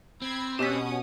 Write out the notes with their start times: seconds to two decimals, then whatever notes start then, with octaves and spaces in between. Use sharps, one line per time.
0.22 C4 B5 G#6
0.59 B2 C#4 G4 D#6 B6